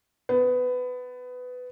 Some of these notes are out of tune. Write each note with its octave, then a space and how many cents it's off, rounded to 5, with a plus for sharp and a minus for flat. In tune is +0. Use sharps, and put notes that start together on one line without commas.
B3 +20